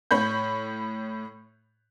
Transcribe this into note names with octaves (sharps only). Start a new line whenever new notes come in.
A2 C#5 B5 G6